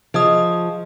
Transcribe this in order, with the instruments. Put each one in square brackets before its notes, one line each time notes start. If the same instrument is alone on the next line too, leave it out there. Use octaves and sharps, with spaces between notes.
[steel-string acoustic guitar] F3 [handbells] G#4 D#5 D#6